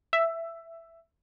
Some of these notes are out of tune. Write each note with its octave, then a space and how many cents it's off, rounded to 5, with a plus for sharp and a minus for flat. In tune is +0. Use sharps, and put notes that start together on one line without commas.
E5 +10